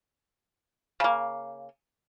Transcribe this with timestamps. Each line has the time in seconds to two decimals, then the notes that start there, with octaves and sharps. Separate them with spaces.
1.00 C#3 A#3